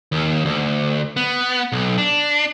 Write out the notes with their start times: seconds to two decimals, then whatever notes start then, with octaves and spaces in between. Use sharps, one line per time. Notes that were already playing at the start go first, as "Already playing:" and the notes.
0.12 D#2
0.45 D2
1.17 B3
1.72 B1
1.98 D4